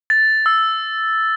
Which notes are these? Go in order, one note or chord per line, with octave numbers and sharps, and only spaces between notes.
A6
E6